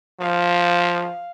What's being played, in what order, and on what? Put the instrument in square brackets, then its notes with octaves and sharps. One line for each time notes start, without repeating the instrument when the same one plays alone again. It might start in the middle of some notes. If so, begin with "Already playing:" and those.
[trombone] F3 [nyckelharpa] F5